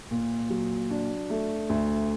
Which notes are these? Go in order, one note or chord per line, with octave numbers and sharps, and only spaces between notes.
A#2
F#3
D4
A3
D2